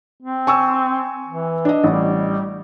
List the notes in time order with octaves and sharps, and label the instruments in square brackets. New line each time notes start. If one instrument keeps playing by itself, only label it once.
[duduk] C4
[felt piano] G#5 C#6 E6
[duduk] E3
[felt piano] D4 D#5
[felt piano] A1 [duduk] G3